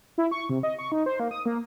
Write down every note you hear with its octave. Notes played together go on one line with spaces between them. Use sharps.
E4
C#6
C3
D#5
C#6
D#4
C5
A#3
D#6
A#3